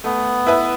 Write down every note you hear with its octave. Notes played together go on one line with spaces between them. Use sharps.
A3 B3
E4 B4 E5